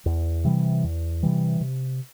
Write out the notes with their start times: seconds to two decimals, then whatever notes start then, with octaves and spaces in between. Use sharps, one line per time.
0.06 E2
0.44 C3 E3 G3
0.84 E2
1.23 C3 E3 G3
1.61 C3